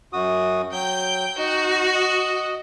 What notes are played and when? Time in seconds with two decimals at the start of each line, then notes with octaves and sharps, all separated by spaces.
0.13 F#2 F#4 D#6
0.72 F#3 G5 G6
1.38 D#4 F#4
1.95 D#5